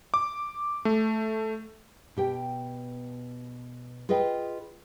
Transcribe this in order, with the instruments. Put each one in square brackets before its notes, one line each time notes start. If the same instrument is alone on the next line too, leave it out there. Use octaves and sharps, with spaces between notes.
[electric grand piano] D6
A3
[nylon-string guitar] B2 G4 G5
F4 G#4 B4 D#5 G5